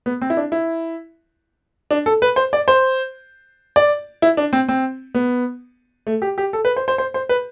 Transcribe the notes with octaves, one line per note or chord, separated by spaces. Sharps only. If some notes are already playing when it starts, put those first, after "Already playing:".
B3
C4
E4
D4
E4
D4
A4
B4
C5
D5
C5
D5
E4
D4
C4
C4
B3
A3
G4
G4
A4
B4
C5
C5
C5
C5
B4